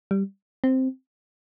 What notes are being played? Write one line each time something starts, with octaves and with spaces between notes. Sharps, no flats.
G3
C4